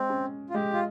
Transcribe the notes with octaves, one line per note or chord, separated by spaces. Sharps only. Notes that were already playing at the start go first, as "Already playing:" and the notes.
Already playing: G#3 C4
C#4
F4
G#3 G4
F4